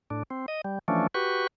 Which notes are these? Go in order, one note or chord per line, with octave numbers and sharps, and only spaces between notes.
A2 D4
C4
D#5
G3
E3 F3 A3 C#4 D4
F#4 G4 B4 C#6